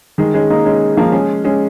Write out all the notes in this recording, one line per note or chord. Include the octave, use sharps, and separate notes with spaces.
D#3 G#3
G#3 C#4
A#3 D#4
G#3 C#4
F3 A#3
G#3 C#4
G#3 C#4